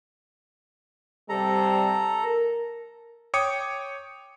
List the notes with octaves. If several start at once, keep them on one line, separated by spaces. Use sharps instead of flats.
C3 G3 A4 A#5
A#4
C#5 G5 D6 D#6 C#7